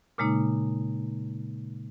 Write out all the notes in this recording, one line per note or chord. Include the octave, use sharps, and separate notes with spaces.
A#2 C#3 G#3 A#3 D#4